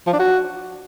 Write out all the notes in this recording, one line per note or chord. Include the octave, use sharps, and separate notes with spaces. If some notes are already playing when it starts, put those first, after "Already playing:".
F3
D4
F#4